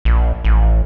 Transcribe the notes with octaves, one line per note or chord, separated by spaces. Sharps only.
A#1
A1